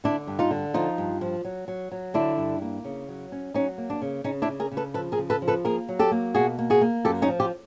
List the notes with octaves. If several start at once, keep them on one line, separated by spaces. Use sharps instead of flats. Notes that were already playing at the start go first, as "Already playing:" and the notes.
D3 D4 E4
G2
D#4 F4
D3
F3 D#4 F4
G2
F3
F#3
F#3
F#3
D3 D4 E4
G2
A#3
C#3
F#3
C#4
F#3 C#4 D#4
A#3
D4
C#3
C#3 C#4 D#4
D4 E4
C#3
G#4 A#4
C#3
A4 B4
F3 A4 B4
G#4 A#4
C#3
A4 B4
F3
A4 B4
A#3 G#4 A#4
F#3
G4 A4
A#3
B2 F#4 G#4
A#3
F#4 G#4
A#3
F#2 G4 A4
C#4 D#4
F3
F4 G4